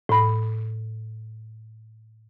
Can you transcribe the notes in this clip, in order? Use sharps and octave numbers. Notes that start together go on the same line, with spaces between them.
A2 B5